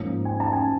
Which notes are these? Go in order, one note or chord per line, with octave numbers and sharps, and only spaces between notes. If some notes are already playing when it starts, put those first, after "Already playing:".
Already playing: G#2 F3 A#3 C#4
G#5
A5
G#5